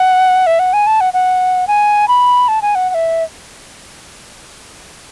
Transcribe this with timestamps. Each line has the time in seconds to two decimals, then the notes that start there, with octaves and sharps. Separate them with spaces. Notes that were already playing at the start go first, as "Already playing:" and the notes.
Already playing: F#5
0.47 E5
0.59 F#5
0.73 G#5
0.87 A5
1.01 F#5
1.14 F#5
1.68 G#5
2.08 B5
2.48 A5
2.62 G#5
2.75 F#5
2.90 F#5
2.94 E5